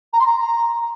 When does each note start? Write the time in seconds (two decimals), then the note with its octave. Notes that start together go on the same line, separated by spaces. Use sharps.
0.13 A#5
0.19 C6
0.26 A#5